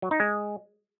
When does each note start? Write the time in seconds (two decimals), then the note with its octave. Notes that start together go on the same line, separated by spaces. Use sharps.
0.02 F#3
0.11 D#4
0.20 G#3